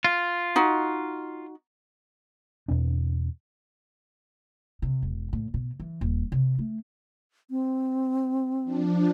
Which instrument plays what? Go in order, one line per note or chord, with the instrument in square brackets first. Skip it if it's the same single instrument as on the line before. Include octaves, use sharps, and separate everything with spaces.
[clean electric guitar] F4
[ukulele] D#4 F#4
[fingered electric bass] E2 B2 C4 D4
[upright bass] C3
E1
A2
B2
E3
D#1
C3
A3
[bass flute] C4
[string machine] F3 D4